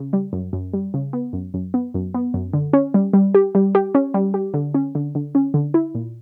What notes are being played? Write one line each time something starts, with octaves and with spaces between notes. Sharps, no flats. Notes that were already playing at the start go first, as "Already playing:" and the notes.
Already playing: C#3
G3
F#2
F#2
G3
C#3
B3
F#2
F#2
B3
F#2
B3
F#2
D3
C#4
G3
G3
G4
G3
G4
C#4
G3
G4
D3
C#4
D3
D3
C#4
D3
E4
A#2